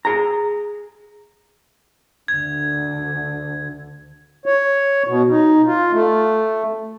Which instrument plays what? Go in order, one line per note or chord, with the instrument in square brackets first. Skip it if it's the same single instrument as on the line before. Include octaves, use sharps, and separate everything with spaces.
[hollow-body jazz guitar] G#4 A#5
[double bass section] D2 D3 [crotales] G#6
[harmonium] C#5
B2
D#4
F4
A3